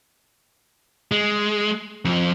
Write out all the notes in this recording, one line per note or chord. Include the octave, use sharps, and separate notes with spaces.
G#3
F2 F3